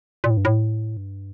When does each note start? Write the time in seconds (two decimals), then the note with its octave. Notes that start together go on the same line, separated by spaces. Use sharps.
0.24 A#2
0.30 A2
0.37 G2
0.45 A2
0.97 G2